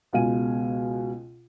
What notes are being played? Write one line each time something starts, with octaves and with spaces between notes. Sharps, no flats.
C#2 B2 G#3 F5 G#5 D#7